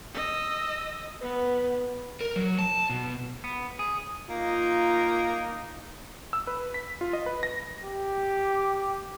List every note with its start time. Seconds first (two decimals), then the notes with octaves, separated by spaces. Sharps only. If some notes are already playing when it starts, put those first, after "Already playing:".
0.14 D#5 E6
1.22 B3 B4
2.21 A#4
2.36 F#3
2.59 A5
2.89 B2
3.44 B3
3.79 G#4
4.29 A#3 D#4 F4
6.33 E6
6.47 B4
6.74 B6
7.01 F4
7.13 D#5
7.26 B4
7.43 A#6
7.81 G4